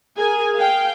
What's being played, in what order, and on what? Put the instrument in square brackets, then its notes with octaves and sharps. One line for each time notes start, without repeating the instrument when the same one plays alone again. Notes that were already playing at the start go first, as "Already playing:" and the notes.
[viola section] G#4 A#4 G#5
F5 G5